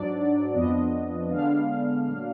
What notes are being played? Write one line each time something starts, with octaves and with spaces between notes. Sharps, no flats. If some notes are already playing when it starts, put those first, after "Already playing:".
Already playing: G#2 F#3 D4 D5
F2 F3 B3 D4 D#5
D3 G#3 B3 D4 F5
A#2 F#3 D4